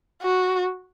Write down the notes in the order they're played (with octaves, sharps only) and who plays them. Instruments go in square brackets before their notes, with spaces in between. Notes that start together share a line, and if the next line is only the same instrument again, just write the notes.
[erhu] F#4